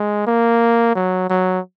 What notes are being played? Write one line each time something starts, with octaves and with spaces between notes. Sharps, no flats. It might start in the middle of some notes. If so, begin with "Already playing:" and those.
Already playing: G#3
A#3
F#3
F#3